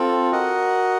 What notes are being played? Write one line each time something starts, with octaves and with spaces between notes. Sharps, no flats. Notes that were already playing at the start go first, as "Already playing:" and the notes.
Already playing: C4 F4 A4
F#4 A#4 D#5 F#5